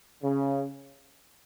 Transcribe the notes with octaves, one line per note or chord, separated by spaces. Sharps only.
C#3